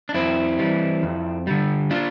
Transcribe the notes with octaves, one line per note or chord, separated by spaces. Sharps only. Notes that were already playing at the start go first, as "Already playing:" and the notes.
D4
F2 C4 E4
E3 G3
F2
D3 G3
D4 F4